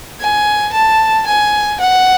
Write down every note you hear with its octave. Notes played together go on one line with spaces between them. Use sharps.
G#5
A5
G#5
F#5